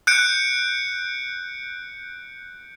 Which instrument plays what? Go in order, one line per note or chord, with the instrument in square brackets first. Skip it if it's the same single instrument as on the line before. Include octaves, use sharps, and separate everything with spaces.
[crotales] F#6 G6 C#7 D7